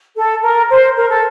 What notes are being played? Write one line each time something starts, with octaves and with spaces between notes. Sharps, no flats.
A4
A#4
C5
A#4
A4